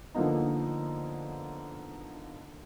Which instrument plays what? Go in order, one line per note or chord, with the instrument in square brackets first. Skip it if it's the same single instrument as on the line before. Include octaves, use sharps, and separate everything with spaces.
[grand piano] D3 F3 A#3 B3 D#4